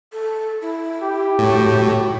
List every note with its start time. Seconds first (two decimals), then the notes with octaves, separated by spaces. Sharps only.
0.13 A4
0.62 E4
1.02 G4
1.38 A2 F#4